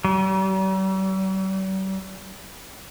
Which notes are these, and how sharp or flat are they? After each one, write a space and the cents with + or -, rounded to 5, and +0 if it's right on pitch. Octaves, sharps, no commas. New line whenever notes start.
G3 -45